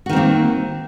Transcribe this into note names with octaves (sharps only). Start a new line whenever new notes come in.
D#3 A#3 C4 F#4